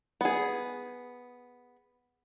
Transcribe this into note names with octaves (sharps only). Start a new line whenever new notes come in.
B3 G#4